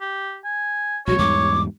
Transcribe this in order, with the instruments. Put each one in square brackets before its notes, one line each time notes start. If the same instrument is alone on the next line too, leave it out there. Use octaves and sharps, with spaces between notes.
[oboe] G4
G#5
[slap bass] A#1 G3 [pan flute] F#4 [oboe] C#5
[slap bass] E2 G#2 G3 [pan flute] D6